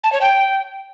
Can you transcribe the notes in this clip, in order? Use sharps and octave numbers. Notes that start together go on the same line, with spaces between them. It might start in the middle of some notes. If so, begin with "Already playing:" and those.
A5
C#5
G5